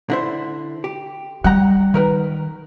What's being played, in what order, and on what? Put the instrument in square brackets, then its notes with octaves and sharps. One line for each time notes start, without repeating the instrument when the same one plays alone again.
[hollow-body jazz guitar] D3 E4 C5
G4
[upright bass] G3 [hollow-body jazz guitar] F#5 G5 A#5
[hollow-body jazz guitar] D#3 A#4 B4